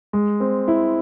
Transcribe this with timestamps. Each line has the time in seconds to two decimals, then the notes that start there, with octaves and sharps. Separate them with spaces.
0.13 G#3
0.40 C4
0.68 E4